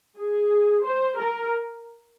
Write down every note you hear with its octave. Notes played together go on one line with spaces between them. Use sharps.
G#4
C5
A#4